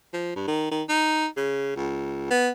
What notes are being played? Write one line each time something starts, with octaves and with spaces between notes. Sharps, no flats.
F3
G2
D#3
D#3
D#4
C#3
C#2
B3